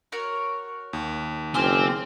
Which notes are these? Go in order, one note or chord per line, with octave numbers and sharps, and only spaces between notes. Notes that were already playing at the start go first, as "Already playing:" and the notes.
F#4 A#4 C#5
D#2
F#1 C4 G#5 D6 F6